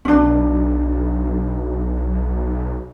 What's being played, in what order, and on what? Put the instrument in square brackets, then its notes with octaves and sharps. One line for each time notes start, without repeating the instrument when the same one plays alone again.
[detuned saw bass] B1 [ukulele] C#4 D4